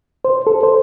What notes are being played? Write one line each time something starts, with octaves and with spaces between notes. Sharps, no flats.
C5
A4
C5